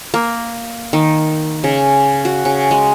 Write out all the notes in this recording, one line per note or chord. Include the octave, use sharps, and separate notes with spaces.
A#3
D#3
C#3
F#4
C#3
G#3